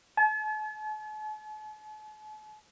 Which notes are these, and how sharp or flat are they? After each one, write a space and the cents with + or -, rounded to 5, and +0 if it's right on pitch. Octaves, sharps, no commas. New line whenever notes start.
A5 -45